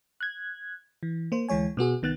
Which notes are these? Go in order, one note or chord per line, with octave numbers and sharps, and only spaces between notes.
F#6 G#6
E3
A#3 C5
D2 E3 G#3 C#5 G#5
B2 B3 F#4 G#4
C2 D#3 B3 F#6 A6